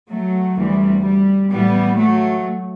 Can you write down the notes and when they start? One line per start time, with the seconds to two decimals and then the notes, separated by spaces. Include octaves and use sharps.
0.11 F#3 A3
0.57 D2 C3 E3 G3
1.04 G3
1.50 A2 E3 G3 B3
1.96 F#3 A3